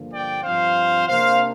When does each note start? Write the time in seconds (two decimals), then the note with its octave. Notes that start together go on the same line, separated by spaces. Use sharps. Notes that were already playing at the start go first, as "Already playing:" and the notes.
Already playing: G2 D3 F3 A#3
0.11 D5 G5
0.43 G2 F3 C4 C5 F5
1.06 C3 A#3 D4 C5 F5